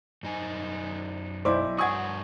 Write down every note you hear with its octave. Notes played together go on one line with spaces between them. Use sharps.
F#2 D#4 G#5
B1 E4 C5 D5 E5 D6
G2 F#4 F#5 G#5 C#6 D#6 G#6